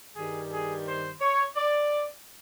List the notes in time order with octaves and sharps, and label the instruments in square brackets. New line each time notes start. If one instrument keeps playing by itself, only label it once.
[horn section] G2 D#3 G3 G#4
G#4
C5
C#5
D5